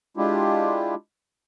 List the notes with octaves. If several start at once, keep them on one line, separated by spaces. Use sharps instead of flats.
G#3 D4 E4 F4 G4